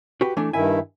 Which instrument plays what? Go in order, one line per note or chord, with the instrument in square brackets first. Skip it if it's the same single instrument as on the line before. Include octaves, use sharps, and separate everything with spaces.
[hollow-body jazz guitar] F#4 G4 B4
E3 A3 D4
[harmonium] G2 D#3 E4 [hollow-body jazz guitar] E5 G#5